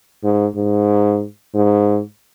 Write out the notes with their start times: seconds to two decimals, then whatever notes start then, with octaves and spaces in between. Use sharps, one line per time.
0.24 G#2
0.56 G#2
1.55 G#2